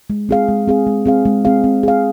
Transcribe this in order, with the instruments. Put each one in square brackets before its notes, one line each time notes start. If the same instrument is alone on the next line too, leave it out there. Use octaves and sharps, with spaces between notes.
[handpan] G#3
C4 G#4 F5
G#3
C4 G#4 F5
G#3
C4 G#4 F5
G#3
C4 G#4 F5
C4
G#4 F5